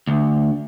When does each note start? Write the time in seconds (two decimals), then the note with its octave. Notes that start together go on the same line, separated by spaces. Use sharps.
0.07 D2